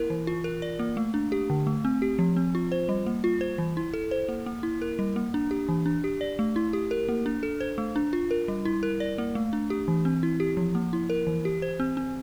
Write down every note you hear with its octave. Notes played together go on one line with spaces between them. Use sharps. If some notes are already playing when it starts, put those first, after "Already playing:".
Already playing: A#3 E4 A#4
E3
F4
A#4
D5
A#3
A3
D4
G4
D3
A3
C4
G4
F3
C4
F4
C5
G3
A#3
F4
C5
E3
E4
A4
C5
A#3
A#3
E4
A#4
G3
A#3
D4
G4
E3
D4
G4
D5
A3
E4
G4
A#4
A#3
D4
A4
C5
A3
D4
F4
A#4
G3
E4
A#4
D5
A#3
A3
D4
G4
E3
C4
E4
G4
F3
A#3
E4
A#4
E3
G4
C5
C4
C4